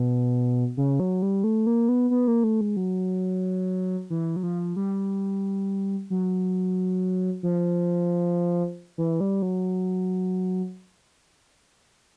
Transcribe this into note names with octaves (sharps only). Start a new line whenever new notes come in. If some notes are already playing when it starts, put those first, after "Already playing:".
Already playing: B2
C#3
F#3
G3
A3
A#3
B3
B3
A#3
A3
G#3
F#3
E3
F#3
F3
G3
F#3
F3
E3
G3
F#3